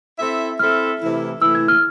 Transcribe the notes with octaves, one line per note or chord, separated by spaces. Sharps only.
C4 E4 A4 E5
C4 E4 A4 E5 F6
C3 E3 A3 E4
C3 E3 A3 E4 E6
G#6
F6